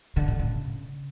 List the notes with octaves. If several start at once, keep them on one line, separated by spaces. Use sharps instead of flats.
D3
A2
C#3